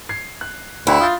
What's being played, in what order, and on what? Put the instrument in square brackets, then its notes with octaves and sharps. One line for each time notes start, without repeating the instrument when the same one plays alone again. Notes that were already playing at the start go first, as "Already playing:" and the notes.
[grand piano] G#6 C7
F#6
[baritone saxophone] D2 [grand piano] D4 G5 F#6 [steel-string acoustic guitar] E4
[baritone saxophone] F4 [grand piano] D#6 G6 A6